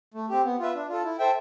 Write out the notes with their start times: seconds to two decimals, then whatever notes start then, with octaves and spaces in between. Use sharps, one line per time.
0.14 A3
0.30 C4 G4
0.44 B3
0.60 F4 B4 E5
0.75 D4
0.89 F4 A4
1.04 E4
1.19 A4 C5 E5 G5